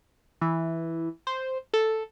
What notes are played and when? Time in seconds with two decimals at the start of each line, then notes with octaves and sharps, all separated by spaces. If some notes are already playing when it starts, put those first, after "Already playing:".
0.41 E3
1.27 C5
1.74 A4